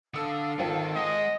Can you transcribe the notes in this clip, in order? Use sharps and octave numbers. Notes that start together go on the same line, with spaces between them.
D3 A4 F5 D#6 E6
G#1 D#3 C4 F4
G#3 D#5 F#5